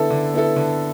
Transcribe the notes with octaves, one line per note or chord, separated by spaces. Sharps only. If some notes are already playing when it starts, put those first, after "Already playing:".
Already playing: D3 B3 E4 A4
D3
B3 E4 A4
D3